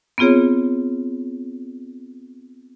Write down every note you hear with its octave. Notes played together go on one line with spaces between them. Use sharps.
B3 C4 F4 G#4 C#5